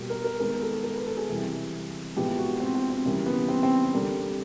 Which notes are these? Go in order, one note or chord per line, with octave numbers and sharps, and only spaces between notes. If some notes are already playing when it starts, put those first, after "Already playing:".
Already playing: B2 G3 A#3
A#4
A#4
D#3 G#3 B3 A#4
A4
A#4
B4
A4
G#4
C3 E3 G3
A2 F3 G#3 B3 G4
F#4
C4
C4
C4
C#3 E3 G3 A#3
B3
C4
C4
D3 G3 A#3